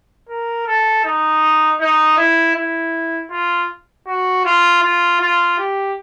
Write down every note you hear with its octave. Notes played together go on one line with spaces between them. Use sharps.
A#4
A4
D#4
D#4
E4
E4
F4
F#4
F4
F4
F4
G4